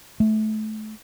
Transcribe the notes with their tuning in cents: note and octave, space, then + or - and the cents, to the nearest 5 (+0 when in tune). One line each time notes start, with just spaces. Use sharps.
A3 -25